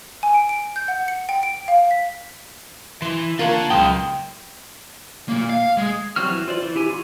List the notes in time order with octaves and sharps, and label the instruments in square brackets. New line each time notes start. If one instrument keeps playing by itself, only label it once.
[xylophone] G#5
D7
D7
G6
F#5
C#7
G5
D7
F5
B6
[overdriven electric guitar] E3 [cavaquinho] E4 C6
[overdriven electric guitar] D3 F#5 [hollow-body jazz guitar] A#3 F4 [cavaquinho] A#4 C#5 A5
[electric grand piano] C#2 G5 [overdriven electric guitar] F#3 C6 [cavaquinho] D#6
[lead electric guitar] A#3 F4
F5
G#3
[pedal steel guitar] F#3 G3 C4 F#4 F6
E3
F4 C5 D5
E3
E4 G4 G#5
F4 F#4